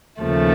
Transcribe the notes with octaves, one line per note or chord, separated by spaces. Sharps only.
D#2 C#3 F3 A3